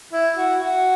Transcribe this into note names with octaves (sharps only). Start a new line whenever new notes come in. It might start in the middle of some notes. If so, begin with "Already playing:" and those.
E4
F#4
F#4